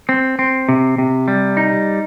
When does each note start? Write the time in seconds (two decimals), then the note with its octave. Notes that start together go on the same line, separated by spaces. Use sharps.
0.09 C4
0.39 C4
0.69 C3
0.98 C3
1.28 G3
1.57 D#4